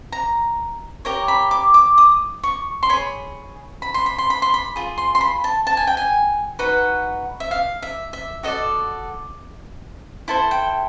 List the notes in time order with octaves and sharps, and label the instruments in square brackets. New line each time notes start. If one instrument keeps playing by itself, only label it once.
[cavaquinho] A#5
G4 A#4 C#5 A#5
B5
D6
D6
D#6
C#6
C6
G#4 C#5 B5
B5
C6
B5
C6
B5
C6
B5
F4 G#4
C6
C6
B5
A5
A5
G#5
G5
G#5
D#4 F#4 B4 F#5
E5
F5
E5
E5
F#4 A4 D5 D#5
E4 A4 C5 A5
G5